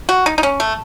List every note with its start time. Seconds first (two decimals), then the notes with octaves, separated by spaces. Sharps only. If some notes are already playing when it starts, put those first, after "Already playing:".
0.09 F#4
0.26 D#4
0.38 D#4
0.43 C#4
0.60 A3